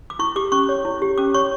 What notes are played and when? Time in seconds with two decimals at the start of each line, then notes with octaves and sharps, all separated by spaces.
0.10 D6
0.19 E4 C#6
0.36 G4 D6
0.52 C#4 C#6
0.69 C#5
0.85 E4
1.02 G4
1.18 C#4 D6
1.34 C#5 C#6